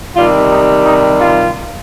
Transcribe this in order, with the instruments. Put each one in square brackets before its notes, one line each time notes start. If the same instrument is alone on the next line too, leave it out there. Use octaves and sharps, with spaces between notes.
[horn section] C3 D#3 G3 F4
D#4
D#4
F4